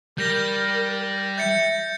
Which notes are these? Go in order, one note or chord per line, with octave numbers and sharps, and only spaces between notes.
G3 A#4 G6 A#6
E5 G6 A6 C#7